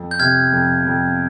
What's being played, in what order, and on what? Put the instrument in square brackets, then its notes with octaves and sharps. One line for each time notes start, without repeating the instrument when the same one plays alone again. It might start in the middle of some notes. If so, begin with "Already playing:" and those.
Already playing: [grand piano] F2
[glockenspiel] G6
[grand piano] C3 [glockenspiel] F6 G#6
[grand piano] F2
F2